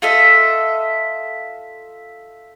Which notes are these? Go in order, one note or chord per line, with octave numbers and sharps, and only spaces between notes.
F4 A4 D#5 E5